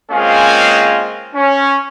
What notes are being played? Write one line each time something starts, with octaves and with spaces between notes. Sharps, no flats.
G#3 A#3 C4 C#4 F4 G#4
C#4